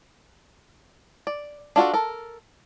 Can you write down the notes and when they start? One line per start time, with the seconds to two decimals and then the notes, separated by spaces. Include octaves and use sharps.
1.27 D5
1.76 D4 F4 F#4 A4
1.94 A4 A#4